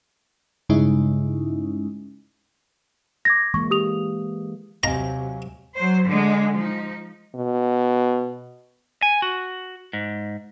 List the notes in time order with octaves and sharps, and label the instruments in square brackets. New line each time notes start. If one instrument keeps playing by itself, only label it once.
[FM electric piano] G2 C#3 G#3 C#4 D#4 E4
[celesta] D6 G#6 A#6
[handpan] E3 G#3 A#3 [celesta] C#6
[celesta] G4 D#6 F7
[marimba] D#2 C4 D#5 [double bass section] C3 F#3 [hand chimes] F5 G#5 [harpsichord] A#5
[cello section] F#3 C5
D3 G#3
F3 D#4
[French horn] B2
[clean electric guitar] G#5
F#4
G#2